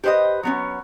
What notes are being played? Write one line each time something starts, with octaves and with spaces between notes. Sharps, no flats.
G4 B4 C5 D5 D#5
F#3 B3 C#4